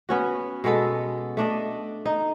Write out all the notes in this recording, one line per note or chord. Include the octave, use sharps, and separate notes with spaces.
B3 C#4 F#4
B2 G#3 B3 A4
A3 D4 D#5
D#4